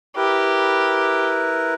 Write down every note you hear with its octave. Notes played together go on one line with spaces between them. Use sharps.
E4 G4 A#4 B4